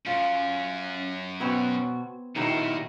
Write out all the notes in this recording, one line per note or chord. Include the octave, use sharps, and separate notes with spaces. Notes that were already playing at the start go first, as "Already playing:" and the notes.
F#2 C#4 F4
B2 B3 C4 F#4 C#5
A#2 D#3 F#3 D#4 E4 G4